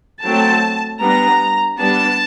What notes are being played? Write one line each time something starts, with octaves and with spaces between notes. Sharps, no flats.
F#3 A3 C4 A5
G3 B3 D4 A#5
G3 B3 D4 A5